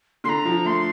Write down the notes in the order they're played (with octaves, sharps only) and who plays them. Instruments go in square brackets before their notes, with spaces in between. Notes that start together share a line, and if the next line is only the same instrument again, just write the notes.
[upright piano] D3 [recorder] A#5 C6
[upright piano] F3
[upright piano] A3 [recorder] C6